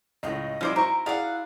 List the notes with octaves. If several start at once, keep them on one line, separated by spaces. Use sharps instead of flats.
C#2 A2 G4 D#5
F3 G3 C#4 E4 C5 F5 F#5 D6
E4 F#4 A#4 C5 A#5 C#6
E4 G#4 D5 F5 F#5